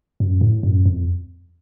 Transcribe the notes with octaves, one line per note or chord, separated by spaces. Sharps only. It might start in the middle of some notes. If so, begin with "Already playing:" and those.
F#2
A2
F#2
F2